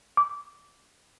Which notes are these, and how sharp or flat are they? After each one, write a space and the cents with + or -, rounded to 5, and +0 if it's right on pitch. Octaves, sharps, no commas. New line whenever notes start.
D6 -15